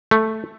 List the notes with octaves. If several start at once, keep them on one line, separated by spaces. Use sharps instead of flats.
A3